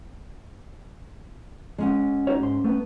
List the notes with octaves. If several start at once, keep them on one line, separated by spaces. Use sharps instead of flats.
G#3 C#4 F#5
D#4 F#4 C#5
G#2 C6
A3 B3